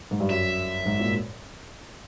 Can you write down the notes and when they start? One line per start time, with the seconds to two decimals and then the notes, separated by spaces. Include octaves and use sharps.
0.11 G#2
0.20 G2
0.30 F#2 E5
0.86 G#2
1.00 A#2